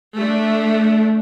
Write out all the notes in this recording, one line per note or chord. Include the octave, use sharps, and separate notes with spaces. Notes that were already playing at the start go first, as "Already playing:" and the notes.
A3 D4